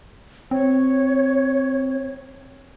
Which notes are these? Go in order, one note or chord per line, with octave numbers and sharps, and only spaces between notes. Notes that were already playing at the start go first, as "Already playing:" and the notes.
C4 C#5